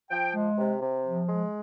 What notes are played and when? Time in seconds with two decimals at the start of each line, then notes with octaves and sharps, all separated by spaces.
0.11 F3 G5
0.35 G#3
0.58 C3
0.81 C3
1.05 F3
1.29 G#3